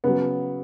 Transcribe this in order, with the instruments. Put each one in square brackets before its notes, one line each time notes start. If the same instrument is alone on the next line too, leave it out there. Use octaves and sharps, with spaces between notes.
[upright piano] C#3 F#3 B3